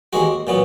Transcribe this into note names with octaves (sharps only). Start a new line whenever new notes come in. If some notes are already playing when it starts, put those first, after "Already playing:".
D#2 D#3 G#3 F#4
A#2 F#3 B3